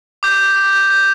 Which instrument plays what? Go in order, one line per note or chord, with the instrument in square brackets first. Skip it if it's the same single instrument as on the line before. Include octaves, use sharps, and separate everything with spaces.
[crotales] D6 G6
G6
D6
G6
G6